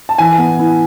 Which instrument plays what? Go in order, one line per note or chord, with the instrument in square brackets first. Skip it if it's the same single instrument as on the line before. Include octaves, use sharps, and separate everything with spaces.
[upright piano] A5
[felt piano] E3 [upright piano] G#5
[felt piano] B3
E4